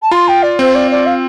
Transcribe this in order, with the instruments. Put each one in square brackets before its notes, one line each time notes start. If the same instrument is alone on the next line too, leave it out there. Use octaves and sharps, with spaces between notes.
[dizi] A5
[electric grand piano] F4 [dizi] C6
[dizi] G5
D5
[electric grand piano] C4 [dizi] C5
[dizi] D5
D5
F5